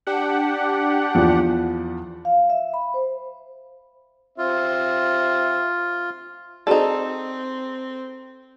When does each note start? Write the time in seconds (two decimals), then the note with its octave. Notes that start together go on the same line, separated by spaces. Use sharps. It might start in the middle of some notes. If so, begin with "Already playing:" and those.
0.07 D4 G4 F#5
1.15 E2 F3
2.25 F5
2.50 E5
2.74 B5
2.94 C5
4.38 C4 F4 E5
6.67 C4 D#4 F#4 G#4 A4 D5